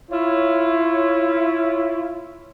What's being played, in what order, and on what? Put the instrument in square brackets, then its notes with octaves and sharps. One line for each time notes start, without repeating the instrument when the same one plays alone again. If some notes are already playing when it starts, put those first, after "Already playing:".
[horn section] E4 F4 C#5